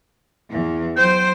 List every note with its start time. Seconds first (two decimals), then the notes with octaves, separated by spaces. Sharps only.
0.50 E2 E3
0.97 F#3 C5 G5